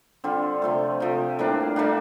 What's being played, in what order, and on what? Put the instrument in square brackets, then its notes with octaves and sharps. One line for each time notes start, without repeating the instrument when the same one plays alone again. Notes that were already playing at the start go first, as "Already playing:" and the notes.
[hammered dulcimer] D3 G3 C4 F4
C3 F3 A3
C3 F3 A3
A2 G3 A#3 D4
A2 G3 A#3 D4